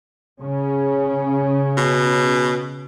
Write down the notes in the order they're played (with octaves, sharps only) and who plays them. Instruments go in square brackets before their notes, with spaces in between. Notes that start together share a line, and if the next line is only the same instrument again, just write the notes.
[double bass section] C#3 C#4
[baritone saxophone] B2